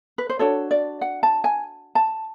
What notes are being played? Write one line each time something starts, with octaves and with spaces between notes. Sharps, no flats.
B4
C5
D4 F#4 A4 C#5
D5
F#5
A5
G#5
A5